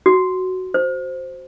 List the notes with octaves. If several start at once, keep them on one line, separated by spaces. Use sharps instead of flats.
F#4
C5